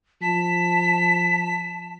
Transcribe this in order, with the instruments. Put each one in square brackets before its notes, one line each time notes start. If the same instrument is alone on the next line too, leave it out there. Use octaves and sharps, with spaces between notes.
[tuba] F3 [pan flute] A5 [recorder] B6